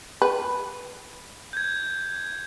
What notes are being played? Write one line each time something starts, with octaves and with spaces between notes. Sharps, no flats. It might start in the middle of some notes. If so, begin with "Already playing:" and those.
B4
G6 G#6